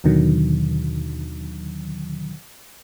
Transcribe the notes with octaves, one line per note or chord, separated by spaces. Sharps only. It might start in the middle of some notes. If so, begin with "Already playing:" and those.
D#2 B2 D3 D#3 F#3